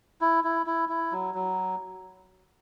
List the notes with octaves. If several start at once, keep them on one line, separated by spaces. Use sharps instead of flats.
E4
E4
E4
E4
F#3
F#3